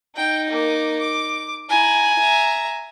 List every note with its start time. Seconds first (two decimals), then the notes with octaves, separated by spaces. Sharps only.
0.16 D#4 G5
0.50 A#3 D6
0.99 D6
1.69 E4 G#5 A#5
2.19 E5 A#5